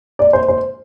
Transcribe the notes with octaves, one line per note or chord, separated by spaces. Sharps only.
D5
C5
C5